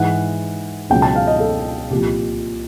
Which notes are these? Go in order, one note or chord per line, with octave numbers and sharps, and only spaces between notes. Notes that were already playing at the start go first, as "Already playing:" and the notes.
Already playing: G#2 E3 F#5
C#2 B2 F#3 G5
A5
F5
D#5
A4
C2 A#2 F3 G4